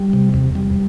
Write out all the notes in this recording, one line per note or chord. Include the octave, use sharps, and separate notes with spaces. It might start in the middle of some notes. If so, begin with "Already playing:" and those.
Already playing: G3
C3
E2
G3